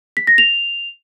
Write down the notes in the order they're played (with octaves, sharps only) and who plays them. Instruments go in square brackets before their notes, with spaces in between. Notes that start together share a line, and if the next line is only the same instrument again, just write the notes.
[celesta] B6
A#6
F7